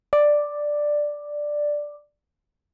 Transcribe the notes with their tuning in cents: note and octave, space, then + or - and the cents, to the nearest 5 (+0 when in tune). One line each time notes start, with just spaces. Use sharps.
D5 +5